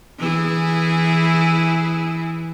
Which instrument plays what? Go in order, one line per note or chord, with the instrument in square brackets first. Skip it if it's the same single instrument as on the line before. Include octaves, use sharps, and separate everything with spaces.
[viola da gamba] E3 E4 G#4